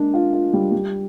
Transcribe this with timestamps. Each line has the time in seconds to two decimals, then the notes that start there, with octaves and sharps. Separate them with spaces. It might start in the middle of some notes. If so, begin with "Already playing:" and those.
Already playing: G#3 A#3 D4
0.14 F4
0.34 F4
0.53 G3
0.72 G3